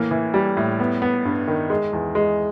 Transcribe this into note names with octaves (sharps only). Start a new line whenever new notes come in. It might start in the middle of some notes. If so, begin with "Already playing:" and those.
Already playing: A2 E3 A#3
E3
G3
A2
B3
B3
G2
D#3
G#3
E2
G#3